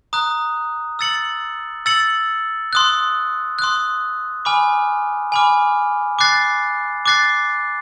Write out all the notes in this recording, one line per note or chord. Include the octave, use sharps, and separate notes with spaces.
A#5 D#6 F#6
E6 A6 C#7 F#7
E6 A6 C#7 F#7
C6 D#6 F#6
C6 D#6 F#6
G#5 B5 D6 F6
G#5 B5 D6 F6
D6 F#6 A6 C7
D6 F#6 A6 C7